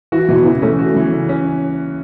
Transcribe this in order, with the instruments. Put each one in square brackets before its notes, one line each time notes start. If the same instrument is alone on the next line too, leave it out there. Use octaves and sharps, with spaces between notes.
[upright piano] E3 [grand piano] F#4
[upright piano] B2 [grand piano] E3
[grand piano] C#3 [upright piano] E3
[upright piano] A3 [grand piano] C#4
[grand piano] F#4
E3
C#3
C#4